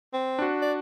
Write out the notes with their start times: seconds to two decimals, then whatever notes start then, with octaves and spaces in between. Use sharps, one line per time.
0.13 C4
0.39 D4 F#4
0.62 D5